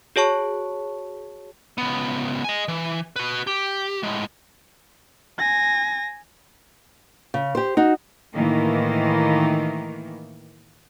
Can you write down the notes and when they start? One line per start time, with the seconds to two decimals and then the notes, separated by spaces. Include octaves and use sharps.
0.16 F#4 G#4 C#5 A5 C#6
1.78 C#2 B3
2.44 D#5 G#5
2.68 E3
3.16 F#4 B4
3.47 G4
4.03 A2 G#3
5.39 G#5 A#6
7.34 C#3
7.55 G4 C5
7.77 D#4 F#4
8.35 A2 D#3 E3 A#3